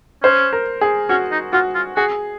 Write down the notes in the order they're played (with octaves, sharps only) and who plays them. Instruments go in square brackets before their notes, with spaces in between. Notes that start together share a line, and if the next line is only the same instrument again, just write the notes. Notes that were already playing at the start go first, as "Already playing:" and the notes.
[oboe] C#4 [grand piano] C5
[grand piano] A#4
G#4
[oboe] C#4 [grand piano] F#4
[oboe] D#4
[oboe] F4 [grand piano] F#4
[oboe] F4
[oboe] F#4 [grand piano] G#4